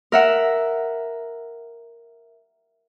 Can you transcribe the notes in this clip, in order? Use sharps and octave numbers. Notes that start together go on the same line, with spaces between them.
A#4 E5 F#5